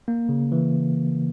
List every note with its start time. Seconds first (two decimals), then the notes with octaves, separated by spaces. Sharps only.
0.08 A#3
0.29 C#3
0.52 E3